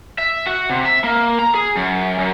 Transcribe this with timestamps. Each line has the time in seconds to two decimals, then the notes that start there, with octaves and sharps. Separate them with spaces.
0.18 E5
0.47 F#4
0.70 C3
0.85 E5
1.04 A#3
1.39 A#5
1.54 G#4
1.76 F#2
2.19 F#2